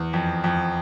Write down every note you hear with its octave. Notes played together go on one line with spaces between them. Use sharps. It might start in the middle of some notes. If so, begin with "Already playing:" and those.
Already playing: E2
F2
F2